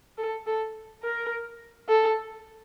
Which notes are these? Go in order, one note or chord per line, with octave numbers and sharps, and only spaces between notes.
A4
A4
A#4
A4